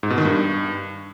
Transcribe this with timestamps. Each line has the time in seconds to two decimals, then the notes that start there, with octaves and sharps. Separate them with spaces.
0.03 G#2
0.10 B2
0.18 D#3
0.25 G2